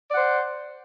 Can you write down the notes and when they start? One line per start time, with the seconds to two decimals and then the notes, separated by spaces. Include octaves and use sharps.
0.09 D5
0.13 F#5
0.17 C5